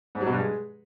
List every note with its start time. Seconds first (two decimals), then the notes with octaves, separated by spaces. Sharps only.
0.15 G#2
0.21 F#3
0.26 B2
0.32 G2
0.38 G#3